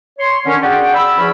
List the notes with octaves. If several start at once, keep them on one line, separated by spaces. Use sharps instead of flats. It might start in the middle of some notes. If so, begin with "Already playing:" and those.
C#5 C6
D3 D#3 C#4
D4 F#4 G#4 D5 F#5 G5
B5 E6
E2 F3 C#4 B5